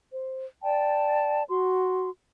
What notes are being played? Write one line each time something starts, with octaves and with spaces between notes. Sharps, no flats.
C5
D5 G5 A5
F#4 C6